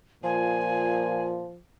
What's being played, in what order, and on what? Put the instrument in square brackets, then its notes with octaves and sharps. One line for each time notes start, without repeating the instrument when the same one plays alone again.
[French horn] A#2 [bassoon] F3 [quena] G#5